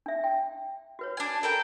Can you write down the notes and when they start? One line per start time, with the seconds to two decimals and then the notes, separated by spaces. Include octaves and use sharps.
0.06 D4 E5
0.24 G5
0.99 F#4 B4 C#5
1.17 D4 G#5
1.43 A4 A#4 G5